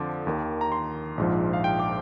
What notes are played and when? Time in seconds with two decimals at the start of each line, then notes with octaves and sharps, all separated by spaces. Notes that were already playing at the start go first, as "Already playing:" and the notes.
Already playing: F2 D3 F3 D6
0.27 D#2 D#3
0.61 A#5
0.72 C6
1.18 A#1 G#2 F3
1.53 F5
1.64 G5
1.80 D6